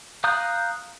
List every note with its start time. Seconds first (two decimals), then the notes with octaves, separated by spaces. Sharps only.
0.24 F5 A#5 D#6 F#6 G6